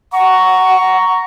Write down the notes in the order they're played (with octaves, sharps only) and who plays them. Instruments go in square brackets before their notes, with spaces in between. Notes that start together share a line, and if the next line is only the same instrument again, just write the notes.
[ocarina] F#5 [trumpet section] A#5 C#6